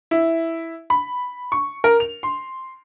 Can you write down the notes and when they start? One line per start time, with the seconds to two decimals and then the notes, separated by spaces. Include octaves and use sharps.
0.11 E4
0.90 B5
1.52 C#6
1.84 A#4
2.00 F7
2.23 C6